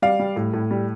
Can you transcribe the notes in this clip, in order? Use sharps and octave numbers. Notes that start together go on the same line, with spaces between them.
G3 D5 F5
G3
A2
A2
G3